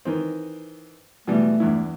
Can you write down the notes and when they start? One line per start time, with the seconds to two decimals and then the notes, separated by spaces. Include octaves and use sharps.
0.05 D#3 E3 C4
1.27 B2 E3 G3 A3
1.60 E2 G2 E4